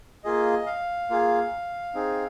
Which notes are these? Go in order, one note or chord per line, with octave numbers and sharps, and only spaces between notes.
A#3 F4 G#4 D#5
F5
A#3 F4 G#4
C4 D#4 G#4